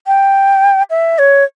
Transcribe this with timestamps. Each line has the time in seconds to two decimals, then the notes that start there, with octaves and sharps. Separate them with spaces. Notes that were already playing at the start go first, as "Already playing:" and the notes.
0.07 G5
0.90 E5
1.19 C#5